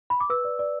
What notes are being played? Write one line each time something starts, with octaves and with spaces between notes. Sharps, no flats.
B5
D6
B4 E6
D5
D5